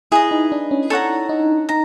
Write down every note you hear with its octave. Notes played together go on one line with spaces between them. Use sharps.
E4 G#4 B4 D#5
D#4
D4
C#4
A4 C#5 F#5 A#5
D#4
D#4 A#5